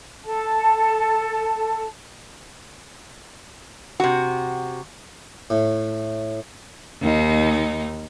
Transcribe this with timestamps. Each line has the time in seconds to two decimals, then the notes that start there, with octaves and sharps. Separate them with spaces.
0.24 A4 A5
4.00 C3 F#4
5.50 A2
7.01 D#2 D#4